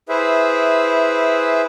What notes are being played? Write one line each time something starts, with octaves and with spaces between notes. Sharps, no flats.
E4 G#4 B4 C5 E5